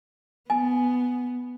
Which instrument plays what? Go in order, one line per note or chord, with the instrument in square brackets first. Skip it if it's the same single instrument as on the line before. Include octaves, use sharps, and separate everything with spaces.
[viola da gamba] B3 [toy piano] G#5